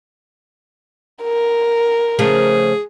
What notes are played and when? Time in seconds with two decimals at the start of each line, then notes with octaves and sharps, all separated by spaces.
1.22 A#4
2.19 C#3 F3 A3 G#4